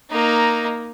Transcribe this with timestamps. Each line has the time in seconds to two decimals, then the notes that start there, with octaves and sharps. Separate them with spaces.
0.10 A#3 D#4